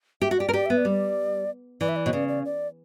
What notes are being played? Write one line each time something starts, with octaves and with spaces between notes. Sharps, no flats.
G4 E5
F#4
G4 D5
A#4
G4 D5
B3 E5
D5
G3
E3 D5
E5
D5
B2 C#5
C#3 D5
D5
D5